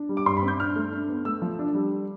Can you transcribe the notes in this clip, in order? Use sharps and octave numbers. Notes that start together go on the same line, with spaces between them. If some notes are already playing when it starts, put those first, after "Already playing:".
Already playing: D4
G3
D6
G2 C6
B5
C4
G6
D4 F6
A3
D4
B3
A3 E6
F3
D4
G3